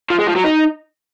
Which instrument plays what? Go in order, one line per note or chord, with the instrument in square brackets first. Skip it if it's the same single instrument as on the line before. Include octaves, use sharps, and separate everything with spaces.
[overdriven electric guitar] F3
G#3
F3
F#3
D#4